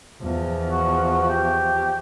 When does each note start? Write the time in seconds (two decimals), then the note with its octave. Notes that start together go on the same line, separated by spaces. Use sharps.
0.21 E2 F3
0.71 F#4
1.29 G4